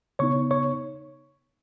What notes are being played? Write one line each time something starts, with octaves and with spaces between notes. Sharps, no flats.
C#3 B3 D#4 C#5 C#6
C#5 C#6